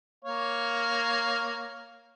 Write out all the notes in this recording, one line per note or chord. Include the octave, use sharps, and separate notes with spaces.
A#3 C#5 F5